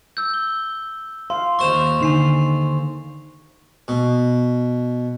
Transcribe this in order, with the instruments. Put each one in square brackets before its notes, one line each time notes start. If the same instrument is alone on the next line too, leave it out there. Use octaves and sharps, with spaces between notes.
[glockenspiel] E6 G6
G7
[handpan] F5 [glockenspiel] C6
[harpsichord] D#2 C5 C6 [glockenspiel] C#6 E7 F7
[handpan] D3 D#4 [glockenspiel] G#5 C7 F7
[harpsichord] B2